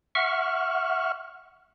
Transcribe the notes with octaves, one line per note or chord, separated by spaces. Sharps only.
E5 F#5 C#6 F6